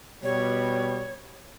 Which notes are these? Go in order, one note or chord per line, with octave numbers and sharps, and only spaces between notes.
B2 G3 C#5